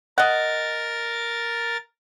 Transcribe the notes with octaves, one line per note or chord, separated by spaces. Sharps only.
A#4 D#5 F#5 A6